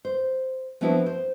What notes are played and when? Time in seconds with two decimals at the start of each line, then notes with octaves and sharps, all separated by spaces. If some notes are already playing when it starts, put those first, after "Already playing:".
0.05 C5
0.81 F3 B3 C4 D4 E4 F#4
1.06 C5